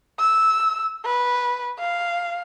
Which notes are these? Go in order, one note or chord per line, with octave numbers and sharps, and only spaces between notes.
E6
B4
F5